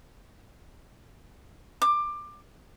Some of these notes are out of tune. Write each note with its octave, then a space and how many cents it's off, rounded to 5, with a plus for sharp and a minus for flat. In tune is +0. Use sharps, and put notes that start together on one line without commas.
D6 +20